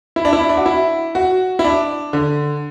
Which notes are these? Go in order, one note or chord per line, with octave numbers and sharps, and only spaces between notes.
E4
D4
E4
D4
F#4
E4
F#4
E4
D4
D3